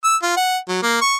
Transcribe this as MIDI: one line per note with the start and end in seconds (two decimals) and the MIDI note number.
0.04 0.16 88
0.22 0.33 65
0.37 0.57 78
0.68 0.80 54
0.82 0.97 58
1.01 1.16 85